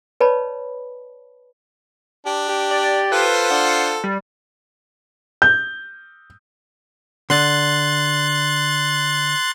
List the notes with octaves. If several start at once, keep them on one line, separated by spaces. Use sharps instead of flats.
B4 C#5 D5 A5 B5
D4 G4
G4
D5
F4 A4 B4 C5
D4 F#5
G3
G6
D3 C6 F#6 A6